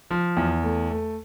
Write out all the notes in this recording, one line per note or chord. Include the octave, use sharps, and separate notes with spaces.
F3
E2
A3
A3